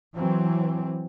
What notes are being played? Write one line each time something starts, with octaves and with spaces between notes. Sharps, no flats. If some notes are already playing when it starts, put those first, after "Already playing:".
E3 F#3 C4